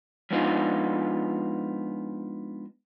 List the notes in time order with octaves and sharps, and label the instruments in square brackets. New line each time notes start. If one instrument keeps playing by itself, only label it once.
[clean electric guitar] F3 G#3 B3 D4 D#4 F4